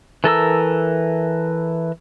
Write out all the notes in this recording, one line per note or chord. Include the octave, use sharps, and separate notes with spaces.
E3 A4 A#4 E6